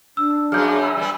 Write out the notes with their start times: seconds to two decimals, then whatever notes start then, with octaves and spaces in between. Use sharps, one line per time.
0.17 D4 E6
0.52 F#2 F#3 B3 G#4 F5 D6 F6 G6
0.82 G#5 B5 E6
0.97 G3 B3